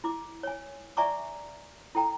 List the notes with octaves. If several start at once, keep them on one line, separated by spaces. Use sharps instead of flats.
E4 D6
C#5 G#5
D5 E5 G#5 A#5 C#6 D6
E4 A4 G5 A#5